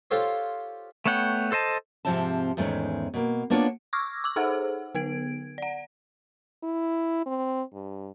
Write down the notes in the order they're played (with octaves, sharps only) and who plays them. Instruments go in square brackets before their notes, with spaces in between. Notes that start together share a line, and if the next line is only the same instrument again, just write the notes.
[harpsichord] F4 G4 A4 C5 C#5
[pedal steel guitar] A3 B3 C#5 F#5 G5
A4 C5 D#5 A5
[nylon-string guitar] G#2 C3 F3 C4 E5 A5
E2 G#2 D#3 G#3 A3 C#4
B2 A#3
A#3 B3 D4 F4 C#5
[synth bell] C#6 D6 E6 F6 G#6 A#6
D6 E6 F#7
D#4 G#4 A4 C5 F#5
D3 B3 G#6 D7
D5 F#5
[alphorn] E4
C4
G2